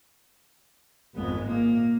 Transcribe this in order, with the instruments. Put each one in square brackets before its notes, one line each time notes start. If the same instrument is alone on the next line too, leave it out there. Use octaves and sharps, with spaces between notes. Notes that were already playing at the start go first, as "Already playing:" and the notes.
[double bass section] G#1 F2 G#3 [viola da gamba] B3
[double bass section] A#2 [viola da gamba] A#3